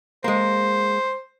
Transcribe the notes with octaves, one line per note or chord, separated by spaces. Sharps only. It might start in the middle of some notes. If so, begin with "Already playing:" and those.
G#3 A#3 C5